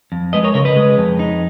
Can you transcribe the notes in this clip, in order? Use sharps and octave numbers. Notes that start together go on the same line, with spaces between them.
F2
G#3 B4 D#5
A#4 C#5
C#3 A#4 C#5
B4 D#5
G#3
F2
D#4